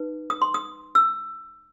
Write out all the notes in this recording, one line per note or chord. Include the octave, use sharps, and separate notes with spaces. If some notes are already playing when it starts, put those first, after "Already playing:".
Already playing: D#4 B4
D#6
C6
D#6
E6